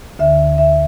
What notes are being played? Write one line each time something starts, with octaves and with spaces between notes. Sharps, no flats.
D2 D3 E5
E5